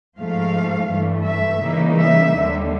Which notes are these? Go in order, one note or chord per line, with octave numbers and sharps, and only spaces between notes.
G#2 F3 A3 F5
G2 E3 A3
E5
C#3 E3 G3 A#3 D#4
E5
D#2 D3 G3